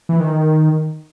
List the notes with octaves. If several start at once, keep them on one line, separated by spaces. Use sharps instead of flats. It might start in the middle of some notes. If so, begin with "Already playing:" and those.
E3
D#3